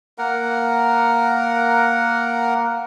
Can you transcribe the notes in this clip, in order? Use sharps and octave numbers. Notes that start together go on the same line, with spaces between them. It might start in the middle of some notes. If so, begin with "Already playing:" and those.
A#3 A#4 F#5